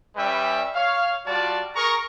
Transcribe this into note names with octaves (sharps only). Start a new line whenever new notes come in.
G3 C#4 B4 E5 G5
C#5 F5
G3 F4 F#4 D5 A5
G#4 A#4 A#5 C#6